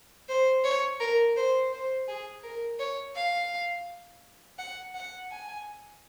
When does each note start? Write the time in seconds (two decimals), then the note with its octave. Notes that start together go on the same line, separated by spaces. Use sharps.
0.29 C5
0.64 C#5
1.00 A#4
1.36 C5
1.73 C5
2.08 G#4
2.43 A#4
2.79 C#5
3.15 F5
4.58 F#5
4.94 F#5
5.31 G#5